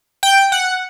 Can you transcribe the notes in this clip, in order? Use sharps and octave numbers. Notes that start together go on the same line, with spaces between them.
G5
F#5